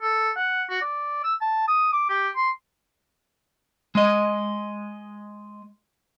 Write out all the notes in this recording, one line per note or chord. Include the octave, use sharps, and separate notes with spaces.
A4
F#5
F#4
D5
E6
A5
D#6
D6
G4
C6
G#3 D#5